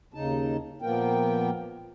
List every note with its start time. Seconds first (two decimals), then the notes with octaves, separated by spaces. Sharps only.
0.14 D#2 C#3 D#4 A5
0.82 A#2 F3 A#3 B3 A#4 G5